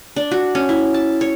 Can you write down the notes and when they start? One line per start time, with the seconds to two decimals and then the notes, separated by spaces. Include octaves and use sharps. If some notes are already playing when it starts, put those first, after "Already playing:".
0.16 D4
0.31 F#4
0.55 C#4
0.69 E4
0.94 A5
1.21 C#5